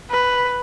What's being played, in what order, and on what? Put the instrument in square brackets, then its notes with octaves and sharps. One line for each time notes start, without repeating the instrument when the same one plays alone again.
[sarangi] B4